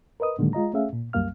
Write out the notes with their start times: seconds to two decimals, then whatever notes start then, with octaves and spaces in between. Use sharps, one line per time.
0.20 A#4 B4 D#5 D#6
0.38 A2 D3 D#3 F#3 G#3 A#3
0.53 G#3 F4 D#5 A#5
0.73 A3 C#4 G#4 E5 F5
0.93 A#2
1.13 C2 F#2 G3 A#3 F5 F6